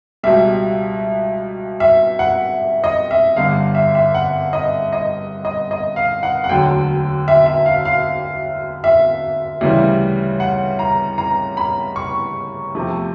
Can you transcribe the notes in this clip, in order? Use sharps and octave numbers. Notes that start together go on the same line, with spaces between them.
C#2 B2 G3 E5
E5
F#5
D#5
E5
G1 G2 D3 F5
E5
E5
F#5
D#5
D#5
D#5
D#5
F5
F#5
F#5
E1 D2 D3 F#3 G5
E5
E5
F5
F5
E5
D2 C#3 E3 G3
F#5
A#5
A#5
B5
C#6
E2 C3 F3 A3